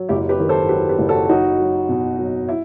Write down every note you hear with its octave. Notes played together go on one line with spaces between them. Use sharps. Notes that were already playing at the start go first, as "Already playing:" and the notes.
Already playing: F#3
F#1 E4 G4
G4 B4
D#3
A4 C5
F#3 G4 B4
G4 B4
F#1
F#4 A4
F#3 D#4 F#4
F#3
B2
F#3
E4